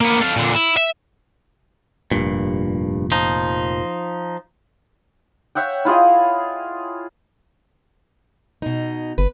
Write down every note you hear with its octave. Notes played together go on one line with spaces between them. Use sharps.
A#3 B3
A4 F5
A#2 D3
E4
E5
F1 G2 A#2
F3 D#4
C#5 E5 F#5 G5
E4 F4 G#4 D#5
B2 D#4
G1 B4